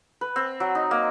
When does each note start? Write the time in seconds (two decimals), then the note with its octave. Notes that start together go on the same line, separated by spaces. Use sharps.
0.21 B4
0.36 C4
0.60 F#3
0.75 D#4
0.91 A#3